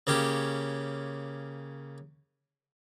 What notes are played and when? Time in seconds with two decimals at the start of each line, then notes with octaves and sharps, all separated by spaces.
0.07 C#3 A#3 C#4 G4